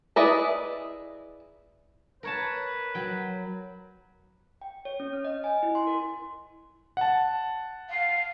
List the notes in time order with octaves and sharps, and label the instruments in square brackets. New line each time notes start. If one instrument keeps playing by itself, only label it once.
[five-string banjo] E4 G#4 B4 D5 D#5
[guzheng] A#4 C#5 A5 [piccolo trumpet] B4
[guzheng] F#3 G5
[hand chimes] G5
C#5
C#4
F6
D#5
G#5
E4
C6
A#4
[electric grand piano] F#5 A5
[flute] F5